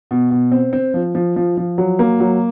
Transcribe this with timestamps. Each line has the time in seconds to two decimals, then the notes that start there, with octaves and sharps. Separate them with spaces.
0.11 B2
0.31 B2
0.52 C4
0.73 C4
0.94 F3
1.15 F3
1.36 F3
1.57 F3
1.78 F#3
1.99 A#3
2.20 F#3